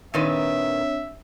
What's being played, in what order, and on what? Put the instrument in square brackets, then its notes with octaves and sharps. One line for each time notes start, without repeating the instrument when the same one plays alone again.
[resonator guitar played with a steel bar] A#2 D#3 B4 [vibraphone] C4 D4 C#5 [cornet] E5